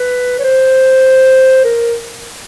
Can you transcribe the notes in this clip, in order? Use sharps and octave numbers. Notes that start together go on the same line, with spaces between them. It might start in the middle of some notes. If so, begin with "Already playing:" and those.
Already playing: B4
C#5
C5
A#4